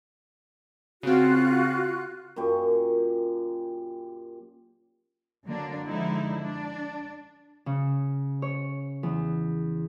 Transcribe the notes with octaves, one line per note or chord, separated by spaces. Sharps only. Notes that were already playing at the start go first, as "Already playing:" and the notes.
C#3 C4 F4 F#4 F#6
F#2 A#2 G4 C#6
D3 F#3 A#3 D4
D3 F3 G#3 D#4 E4
D4
C#3
C#5
E2